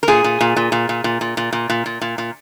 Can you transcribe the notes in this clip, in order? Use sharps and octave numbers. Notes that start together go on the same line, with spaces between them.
A#4
A#2 G#4
A#2
A#2
A#2
A#2
A#2
A#2
A#2
A#2
A#2
A#2
A#2
A#2
A#2